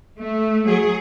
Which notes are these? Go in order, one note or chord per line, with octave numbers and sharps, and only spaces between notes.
A3
F#3 G#4